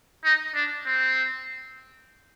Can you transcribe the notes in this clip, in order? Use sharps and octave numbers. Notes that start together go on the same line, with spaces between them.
D#4
D4
C4